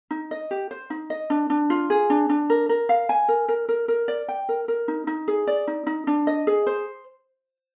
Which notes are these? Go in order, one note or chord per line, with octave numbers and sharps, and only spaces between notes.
D#4
D#5
G4
C5
D#4
D#5
D4
D4
F4
G#4
D4
D4
A#4
A#4
F5
G#5
A#4
A#4
A#4
A#4
D5
G5
A#4
A#4
D#4
D#4
G#4
D5
D#4
D#4
D4
D#5
G#4
C5